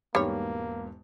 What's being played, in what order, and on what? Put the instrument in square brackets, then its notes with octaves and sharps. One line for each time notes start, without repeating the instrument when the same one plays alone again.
[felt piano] E1 G#2 B3 [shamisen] G3 C#5 [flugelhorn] A#3